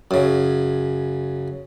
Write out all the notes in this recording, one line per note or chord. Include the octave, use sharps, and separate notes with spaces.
F#2 C#3